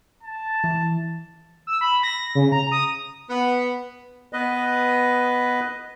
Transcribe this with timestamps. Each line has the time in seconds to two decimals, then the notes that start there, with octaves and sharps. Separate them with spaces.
0.23 A5
0.64 E3
1.67 E6
1.81 B5
2.03 A#6
2.35 C#3
2.52 A#5
2.72 D#6
3.29 B3
4.33 B3 B4 D#5